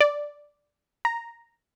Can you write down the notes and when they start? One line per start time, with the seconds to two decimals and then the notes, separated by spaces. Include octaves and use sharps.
0.01 D5
1.05 A#5